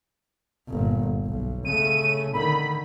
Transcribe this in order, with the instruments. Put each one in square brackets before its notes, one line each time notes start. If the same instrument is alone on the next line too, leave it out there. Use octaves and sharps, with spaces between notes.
[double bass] G1 A#2
B1
[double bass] C#3 A3 [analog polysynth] D#7
[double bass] D3 D#3 [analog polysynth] B5